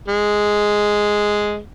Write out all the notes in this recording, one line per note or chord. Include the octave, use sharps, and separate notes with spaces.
G#3